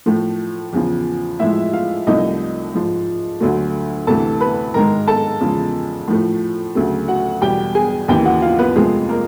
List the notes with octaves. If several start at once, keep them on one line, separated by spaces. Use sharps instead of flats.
A2 F3 A3
E2 C#3 F3
A2 F3 G#3 E4 E5
F4 F5
C2 C3 F3 A3 D#4 D#5
G#2 F3 G#3
D2 D3 F#3 A3
D2 C3 E3 A3 A4 A5
B4 B5
G#2 D#3 G#3 A#4 A#5
A4 A5
E2 C#3 F3 G#3
A2 F3 A3
D2 C#3 F#3 A3
F#4 F#5
E2 B2 G3 G4 G5
G#4 G#5
D#2 C#3 E3 G4 G5
F#4 F#5
F4 F5
B3 B4
F2 C3 F3 G#3 A3 G#4
A#3 A#4